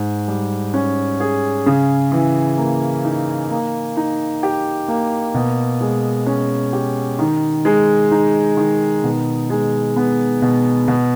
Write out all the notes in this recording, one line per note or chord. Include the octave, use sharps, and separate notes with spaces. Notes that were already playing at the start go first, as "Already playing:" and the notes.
Already playing: G#2
G3
C#4
G#4
C#3
E3
A#3
D#4
A#3
D#4
G4
A#3
B2
G#3
C#4
G4
D#3
G#3
D#4
D#3
B2
G#3
B3
B2
B2